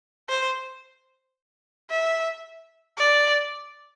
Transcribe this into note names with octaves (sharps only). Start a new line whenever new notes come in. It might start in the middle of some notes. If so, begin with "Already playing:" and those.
C5
E5
D5